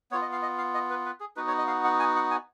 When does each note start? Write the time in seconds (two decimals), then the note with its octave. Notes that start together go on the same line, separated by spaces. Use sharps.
0.11 B3 F4 C#5
0.22 D#5
0.32 F5
0.42 D#5
0.58 F5
0.74 D#5
0.90 B4
1.06 B4
1.20 G#4
1.36 B3 D#4 F#4 B4
1.48 C#5
1.58 D#5
1.67 F5
1.84 F#5
2.00 G#5
2.15 F#5
2.31 G#5